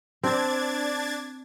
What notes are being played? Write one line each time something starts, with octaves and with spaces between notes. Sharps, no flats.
C4 D4 G#6 A6